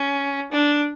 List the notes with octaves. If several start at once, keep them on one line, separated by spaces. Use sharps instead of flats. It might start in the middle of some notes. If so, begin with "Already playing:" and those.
Already playing: C#4
D4